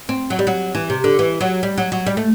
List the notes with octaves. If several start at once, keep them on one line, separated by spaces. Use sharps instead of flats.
C4
F#3
G3
F#3
E3
C3
D3
E3
F#3
G3
F#3
F#3
G3
A3